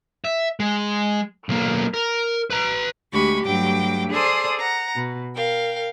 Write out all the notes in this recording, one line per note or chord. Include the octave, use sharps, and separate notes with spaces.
E5
G#3
B1 A#3
A#4
B4 A#5
D2 G#3 A3 G4 B5 C#6
G2 F#3 A3 G5 D6
G#4 A4 C5 D5 C6 D#6
F#5 A#5
B2
A#4 F5 G5